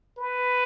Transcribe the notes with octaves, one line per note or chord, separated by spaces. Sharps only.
B4